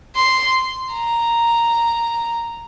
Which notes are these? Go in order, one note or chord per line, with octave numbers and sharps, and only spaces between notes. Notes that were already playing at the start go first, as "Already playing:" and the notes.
C6
A#5